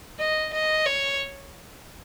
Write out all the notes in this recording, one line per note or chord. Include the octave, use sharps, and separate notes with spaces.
D#5
D#5
C#5